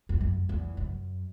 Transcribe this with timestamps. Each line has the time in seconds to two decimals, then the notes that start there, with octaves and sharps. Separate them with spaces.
0.09 E2
0.21 F#2
0.49 E2
0.77 F#2